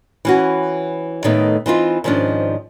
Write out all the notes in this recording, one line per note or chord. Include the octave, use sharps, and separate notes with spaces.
E3 C#4 F#4
A2 D#3 A3 B3 D#4
E3 C4 D#4 F4
G#2 D#3 F3 C#4 D4